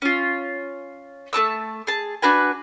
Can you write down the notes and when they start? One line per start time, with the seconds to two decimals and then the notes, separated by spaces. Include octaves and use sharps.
0.02 C#4 F4
1.33 A3 F#4 A5 E6
1.87 G#4 A5
2.22 D4 F#4 B4 G#5